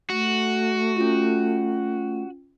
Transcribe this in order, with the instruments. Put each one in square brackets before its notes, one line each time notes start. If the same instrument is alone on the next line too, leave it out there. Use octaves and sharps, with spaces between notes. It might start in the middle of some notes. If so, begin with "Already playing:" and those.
[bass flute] A3 [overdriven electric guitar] F#4
[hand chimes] C#4 F4